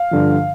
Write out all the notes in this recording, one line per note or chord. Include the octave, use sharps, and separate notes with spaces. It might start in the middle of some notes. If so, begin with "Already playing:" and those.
Already playing: F5
G2 D3 F3